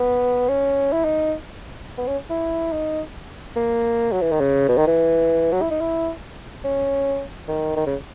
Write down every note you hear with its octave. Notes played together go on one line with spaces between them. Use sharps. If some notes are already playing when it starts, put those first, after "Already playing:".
Already playing: B3
C#4
E4
D#4
B3
C#4
E4
D#4
A#3
F#3
E3
D#3
C#3
B2
D#3
E3
F#3
E4
D#4
E4
C#4
D#3
D#3
C#3